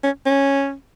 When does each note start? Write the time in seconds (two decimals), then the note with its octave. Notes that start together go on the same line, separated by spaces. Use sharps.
0.03 C#4
0.26 C#4